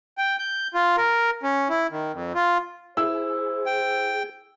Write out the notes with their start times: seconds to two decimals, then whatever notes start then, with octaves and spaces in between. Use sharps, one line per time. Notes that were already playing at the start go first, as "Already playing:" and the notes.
0.18 G5
0.39 G6
0.74 F4
0.97 A#4
1.43 C#4
1.69 E4
1.91 D#3
2.13 F2
2.35 F4
2.97 E4 G#4 C5 E6
3.66 G5